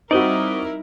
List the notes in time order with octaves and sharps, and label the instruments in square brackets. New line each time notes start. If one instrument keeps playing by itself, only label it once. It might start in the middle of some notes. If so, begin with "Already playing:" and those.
[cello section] G3 E4 A#4 [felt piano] C4 F#4 [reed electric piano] D#4 [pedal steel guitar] D5 D#5